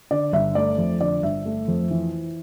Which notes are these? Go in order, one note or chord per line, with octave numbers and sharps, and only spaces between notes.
D3 D5
G1 E5
A3 D5
F2
D3 D5
G1 E5
A3
F2
E3